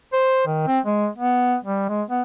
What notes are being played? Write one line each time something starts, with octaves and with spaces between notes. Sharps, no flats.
C5
D#3
C4
G#3
B3
G3
G#3
B3